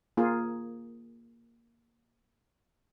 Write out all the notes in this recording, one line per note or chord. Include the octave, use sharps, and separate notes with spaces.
A#3 F4 G#4